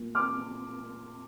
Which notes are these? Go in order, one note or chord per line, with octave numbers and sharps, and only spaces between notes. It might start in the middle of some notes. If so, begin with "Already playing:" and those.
Already playing: A#2
D6 F6